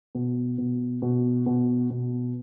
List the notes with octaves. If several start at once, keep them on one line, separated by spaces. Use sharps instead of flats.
B2
B2
B2
B2
B2